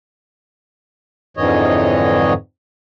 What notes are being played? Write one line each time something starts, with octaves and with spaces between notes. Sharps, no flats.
F2 G#2 D3 E3 C#5 D#5